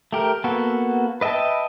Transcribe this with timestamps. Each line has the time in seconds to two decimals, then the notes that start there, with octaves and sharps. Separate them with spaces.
0.13 A3 G4 A#4
0.44 A#3 B3 F#4 A4
1.21 B4 D#5 E5 G5 A5